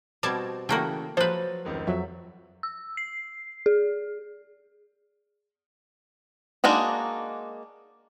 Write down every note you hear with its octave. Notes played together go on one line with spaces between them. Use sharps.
B2 G3 C4 F#4 A5 D6 G#6
C#3 E3 A3 A#3 F#4 G5
F3 F#3 B4 C5 A6
F1 C#2 D#3
F2 F#3 E5
E6
C7
G#4
G#3 A#3 D4 D#4 F#4